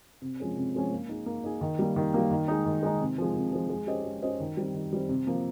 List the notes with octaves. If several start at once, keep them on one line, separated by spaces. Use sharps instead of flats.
C3
F3 G#3 C#4
C3
F3 G#3 C#4
A#3
D#4 G#4
A#3
D#4 G#4
D#3
G3 A#3
D#3
G3 A#3
D#3
G#3 D#4
D#3
G#3 D#4
C3
F3 G#3
C3
F3 G#3
G#3
C#4 G4 C5 D#5
G#3
C#4 G4 C5 D#5
D#3
G3 C4
D#3
G3 C4
C3
F3 A#3